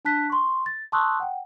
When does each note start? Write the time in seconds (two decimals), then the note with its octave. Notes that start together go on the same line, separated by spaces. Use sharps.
0.05 D4 A5 F#6 B6
0.30 C6 C#6
0.66 A6
0.92 A5 C6 C#6 D#6 E6 F#6
1.20 F#5 G5